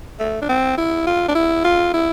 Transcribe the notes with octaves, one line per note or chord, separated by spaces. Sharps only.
A3
D4
C4
E4
F4
D4
E4
F4
E4